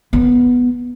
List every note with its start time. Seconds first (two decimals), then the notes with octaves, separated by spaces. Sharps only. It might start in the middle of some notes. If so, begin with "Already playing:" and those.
0.13 B3